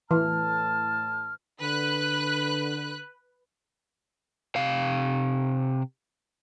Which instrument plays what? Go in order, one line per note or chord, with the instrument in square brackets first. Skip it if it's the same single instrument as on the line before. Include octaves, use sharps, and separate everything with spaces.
[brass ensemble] A2 A5 [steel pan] E3 [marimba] B4 [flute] F6
[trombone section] D3 [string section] B4 F#6
[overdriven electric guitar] C3 F5